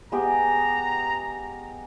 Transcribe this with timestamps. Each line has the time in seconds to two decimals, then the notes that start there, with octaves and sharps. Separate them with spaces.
0.12 G#3 B3 G4 A#5